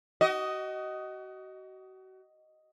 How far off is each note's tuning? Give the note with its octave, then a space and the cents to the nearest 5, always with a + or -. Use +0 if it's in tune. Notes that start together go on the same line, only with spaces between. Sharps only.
F#4 +35 D#5 +5